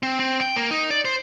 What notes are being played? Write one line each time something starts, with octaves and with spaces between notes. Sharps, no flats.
C4
C4
G5
A#3
D#4
D5
C5